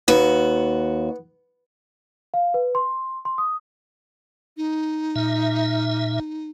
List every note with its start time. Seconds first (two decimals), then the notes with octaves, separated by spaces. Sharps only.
0.08 D#2 B3 F#4
2.34 F5
2.54 B4
2.75 C6
3.25 C6
3.38 D#6
4.57 D#4
5.16 A#2 E5